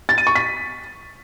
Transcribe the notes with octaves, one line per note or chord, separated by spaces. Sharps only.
A6
D#7
C#6
B6